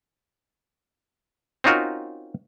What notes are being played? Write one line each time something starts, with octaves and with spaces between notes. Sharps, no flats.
C4 C#4 D#4 F4 F#4 A#4